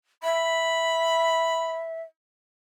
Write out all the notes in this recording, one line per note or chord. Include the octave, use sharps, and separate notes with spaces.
E5 B5